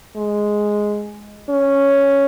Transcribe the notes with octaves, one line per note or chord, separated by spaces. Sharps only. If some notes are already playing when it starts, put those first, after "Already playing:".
G#3
C#4